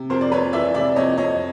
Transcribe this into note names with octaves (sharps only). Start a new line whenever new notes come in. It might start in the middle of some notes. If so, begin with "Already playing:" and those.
Already playing: C3
F2 A#4 C5
D5
F2 B4 C#5
E3 D5 E5
C3 D5 E5
F2 C#5 D#5
F2 C#5 D#5